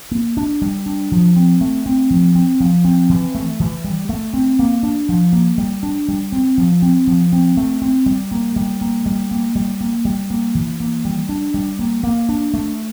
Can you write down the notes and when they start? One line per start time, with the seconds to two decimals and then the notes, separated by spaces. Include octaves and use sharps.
0.11 A#3
0.37 D4
0.62 G3
0.86 D4
1.12 F3
1.36 C4
1.61 A3
1.86 C4
2.10 F3
2.35 C4
2.60 F3
2.85 C4
3.09 E3
3.35 A3
3.60 E3
3.84 G3
4.09 A3
4.34 C4
4.59 A#3
4.83 D4
5.09 F3
5.33 A#3
5.58 G3
5.83 D4
6.08 G3
6.32 C4
6.58 F3
6.82 C4
7.07 F3
7.32 C4
7.57 A3
7.82 C4
8.06 G3
8.31 A#3
8.56 G3
8.81 A#3
9.06 G3
9.31 A#3
9.55 G3
9.81 A#3
10.05 G3
10.30 A#3
10.55 E3
10.80 A#3
11.05 G3
11.29 D4
11.54 G3
11.79 A#3
12.03 A#3
12.29 D4
12.54 A3